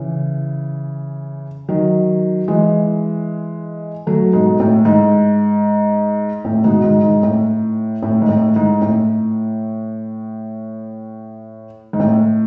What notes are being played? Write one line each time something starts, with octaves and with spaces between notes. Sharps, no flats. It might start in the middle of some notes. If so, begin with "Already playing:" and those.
Already playing: C#3 E3
D#3 F#3
E3 G#3
F#3 A3
G#2 B2
A2
G#2
A2
G#2 B2
G#2
G#2
A2
A2
G#2
A2
G#2
A2
G#2
A2